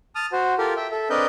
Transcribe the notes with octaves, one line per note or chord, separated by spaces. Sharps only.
A5 D#6 F6
F#4 C5
F4 G4 A4 A#4
E5 G5
A4 E5
C4 D4 A#4 B4 D#5 G6